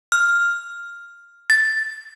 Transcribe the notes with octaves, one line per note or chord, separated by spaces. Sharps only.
F6
A6